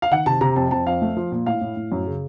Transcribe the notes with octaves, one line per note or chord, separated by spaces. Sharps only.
F5
D#3 F#5
C3 A5
C3 A#5
F2 A5
F2 A5
F2 F5
A3
F3
A#2
A2 F5
A2
A2
F#2
C#3